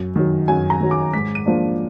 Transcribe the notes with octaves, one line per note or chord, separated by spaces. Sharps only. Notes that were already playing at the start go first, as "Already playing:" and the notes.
Already playing: F#2
D#3 F#3
F#2 G#5
A#5
D#3 F#3
D6
G#2 B6
D#7
F3 A#3 D4